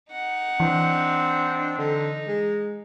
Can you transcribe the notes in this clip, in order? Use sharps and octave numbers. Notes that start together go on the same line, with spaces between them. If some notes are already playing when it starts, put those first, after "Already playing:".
D#4 F#5
E3 C4 D4
D3 D#4
G#3